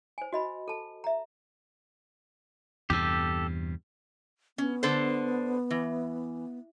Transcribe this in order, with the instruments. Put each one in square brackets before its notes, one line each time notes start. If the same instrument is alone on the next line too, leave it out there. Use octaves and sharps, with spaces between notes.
[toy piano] C5 G#5
F#4 D#5 B5
A4 A5
E5 A#5
[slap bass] E2 G2 C3 [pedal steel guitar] G4 A4
[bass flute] B3 [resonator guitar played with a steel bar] C#4
[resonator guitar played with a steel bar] D3 A4 C5
E3